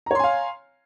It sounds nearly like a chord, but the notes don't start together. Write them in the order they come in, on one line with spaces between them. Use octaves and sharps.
A#5 C#5 C6 G#5 F5